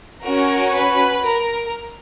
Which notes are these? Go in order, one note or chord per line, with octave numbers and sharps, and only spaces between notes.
C#4 F#4 A#4
B4
A#4